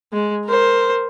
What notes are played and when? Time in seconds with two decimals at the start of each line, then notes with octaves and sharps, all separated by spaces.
0.13 G#3
0.45 A#4 C5